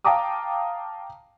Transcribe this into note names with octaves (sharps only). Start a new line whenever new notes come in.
F5 G5 A5 A#5 D6 D#6